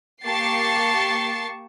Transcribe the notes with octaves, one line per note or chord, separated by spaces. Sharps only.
A#3 G4 A5 C#6 A6 C7